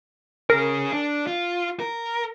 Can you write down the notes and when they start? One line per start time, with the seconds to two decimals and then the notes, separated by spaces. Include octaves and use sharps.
0.50 C#4 G#4 A#4
0.92 D4
1.27 F4
1.80 A#4